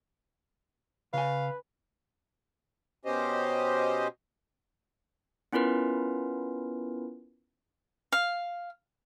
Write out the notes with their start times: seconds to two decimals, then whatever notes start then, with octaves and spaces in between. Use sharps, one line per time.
1.14 C#3 B4 F5 G#5
3.05 B2 C#4 G4 C5 D#5
5.53 B3 C#4 E4 F4 A#4 B4
8.12 F5